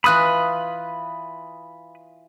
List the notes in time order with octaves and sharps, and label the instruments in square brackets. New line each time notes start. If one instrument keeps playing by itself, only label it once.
[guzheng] E3 F4 B4 [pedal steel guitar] B5 D#6 F#6